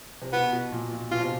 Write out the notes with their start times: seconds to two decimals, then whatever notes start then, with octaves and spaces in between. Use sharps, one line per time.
0.22 C3
0.33 B2 B3
0.53 B2
0.72 A#2
0.91 A#2
1.11 B2 F4
1.20 C3